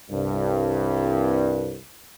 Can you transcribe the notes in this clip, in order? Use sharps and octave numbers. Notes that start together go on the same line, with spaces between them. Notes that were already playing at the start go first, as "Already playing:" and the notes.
C2 G2